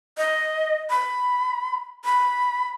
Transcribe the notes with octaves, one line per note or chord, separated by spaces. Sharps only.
D#5
B5
B5